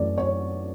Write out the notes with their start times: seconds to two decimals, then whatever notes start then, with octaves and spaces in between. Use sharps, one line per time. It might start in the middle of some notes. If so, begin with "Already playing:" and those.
Already playing: F#2 E3 A3 D5
0.18 C#5